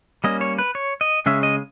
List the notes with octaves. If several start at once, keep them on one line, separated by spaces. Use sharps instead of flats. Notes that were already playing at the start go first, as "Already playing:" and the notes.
G3 A#3 C#4 D#5
C#5
B4
C#5
D#5
C#3 G#3 C#4 E5
D#5